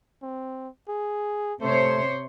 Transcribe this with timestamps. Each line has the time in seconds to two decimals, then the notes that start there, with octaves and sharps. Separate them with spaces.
0.22 C4
0.89 G#4
1.61 C3 A3 C5 C#5